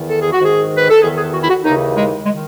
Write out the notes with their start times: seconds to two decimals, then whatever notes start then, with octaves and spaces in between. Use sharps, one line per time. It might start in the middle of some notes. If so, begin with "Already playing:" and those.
Already playing: E2 D#3
0.09 A4
0.21 G#4
0.33 F#4
0.41 G#2 D#3 G#4
0.77 B4
0.90 A4
1.02 E2 G#4
1.05 D#3
1.18 G#4
1.34 F#4
1.42 E4
1.49 F#4
1.64 D#2 C#3 E3 D#4
1.96 G#3
2.26 D#3 G#3